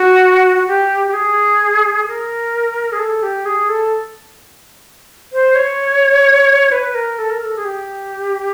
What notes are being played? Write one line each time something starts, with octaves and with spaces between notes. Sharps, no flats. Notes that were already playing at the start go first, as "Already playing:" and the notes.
Already playing: F#4
F#4
G4
G4
G#4
A#4
G#4
A4
G4
G#4
A4
C5
C#5
B4
A#4
A4
A#4
A4
G#4
G4